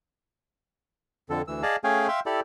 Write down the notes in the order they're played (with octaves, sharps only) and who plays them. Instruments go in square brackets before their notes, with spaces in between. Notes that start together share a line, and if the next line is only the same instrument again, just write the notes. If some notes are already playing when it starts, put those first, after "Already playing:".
[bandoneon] F2 D3 A4
D2 E3 E6
G#4 D5 D#5 F5 A5
A3 C#4 G#4 F5 G5 G#5
E5 F5 G5 C6
E4 G4 A4 D5